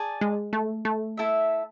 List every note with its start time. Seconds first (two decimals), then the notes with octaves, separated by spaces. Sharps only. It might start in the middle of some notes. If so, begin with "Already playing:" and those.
Already playing: G#4 D5 A5
0.21 G#3
0.53 A3
0.85 A3
1.17 E4 A4 E5